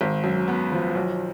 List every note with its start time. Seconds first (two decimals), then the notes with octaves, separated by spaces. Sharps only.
0.01 G#1
0.24 F#2
0.48 B3
0.72 F3
0.95 B1